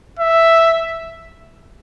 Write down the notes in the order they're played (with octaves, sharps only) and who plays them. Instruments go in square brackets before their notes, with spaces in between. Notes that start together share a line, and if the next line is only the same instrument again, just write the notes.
[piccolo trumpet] E5